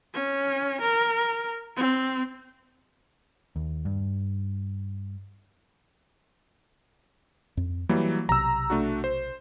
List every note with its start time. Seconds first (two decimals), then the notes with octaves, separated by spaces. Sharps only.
0.14 C#4
0.81 A#4
1.76 C4
3.56 D#2
3.85 G2
7.57 F2
7.89 E3 F#3 G3 A#3
8.29 B1 C3 A#5 E6
8.70 A3 D4 F#4
9.04 C5